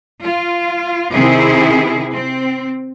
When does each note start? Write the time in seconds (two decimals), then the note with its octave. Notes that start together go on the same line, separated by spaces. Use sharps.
0.21 F4
1.12 C3 D#3 C4 E4 G#4
2.12 C4